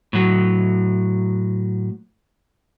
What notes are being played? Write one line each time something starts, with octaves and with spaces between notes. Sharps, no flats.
A2 F#3